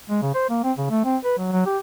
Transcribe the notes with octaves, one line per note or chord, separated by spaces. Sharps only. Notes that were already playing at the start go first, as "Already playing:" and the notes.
G#3
C#3
C5
A#3
C4
C#3
A3
C4
B4
F#3
F#3
G4